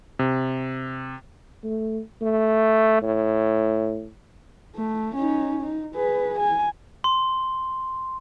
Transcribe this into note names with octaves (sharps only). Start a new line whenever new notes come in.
C3
A3
A3
A2
A3
C#4 D#4
D#4
G#4 B4
G#5
C6